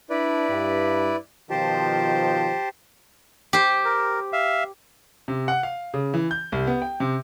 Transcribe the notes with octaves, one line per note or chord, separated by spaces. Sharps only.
D4 E4 B4 D5
G2
B2 D#3 F3 G4 C5 A5
G4 C5
A#4
E5 F5
C3
F#5
F5
C#3
E3
G6
C2
B3
G5
C3